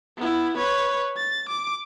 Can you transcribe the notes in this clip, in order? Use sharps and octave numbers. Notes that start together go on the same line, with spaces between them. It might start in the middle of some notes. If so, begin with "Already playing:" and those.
B3 E4
B4 C#5
A6
D6